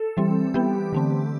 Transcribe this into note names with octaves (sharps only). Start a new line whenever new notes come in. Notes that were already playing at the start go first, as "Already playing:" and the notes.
Already playing: A4
E3 G3 C4
E3 G3 B3 G4
D3 A3 C4